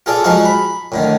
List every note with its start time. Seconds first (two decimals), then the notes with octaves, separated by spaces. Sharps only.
0.06 F4 G#4 A4 D5
0.24 F3 G#3 D#4 F4 F#4 G#4
0.45 B5
0.92 A2 D3 D#3